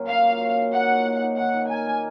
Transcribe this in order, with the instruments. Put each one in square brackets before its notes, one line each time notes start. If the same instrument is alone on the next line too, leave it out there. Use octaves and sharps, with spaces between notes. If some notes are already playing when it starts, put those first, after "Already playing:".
Already playing: [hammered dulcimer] A#2 F#3 C#4
[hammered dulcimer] A#3 [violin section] F5
[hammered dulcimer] F#4
C#5
D#4
[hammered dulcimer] A#3 [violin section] F#5
[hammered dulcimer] F#4
A#3
D#4
[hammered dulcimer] D#3 [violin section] F#5
[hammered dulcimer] D#4
[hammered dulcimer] A#4 [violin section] G#5
[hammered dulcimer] A#3